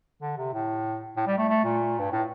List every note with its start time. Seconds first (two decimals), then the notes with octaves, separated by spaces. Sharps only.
0.22 D3
0.38 C3
0.54 A2
1.17 A2
1.27 G3
1.38 A3
1.49 A3
1.64 A#2
1.99 G2
2.12 A2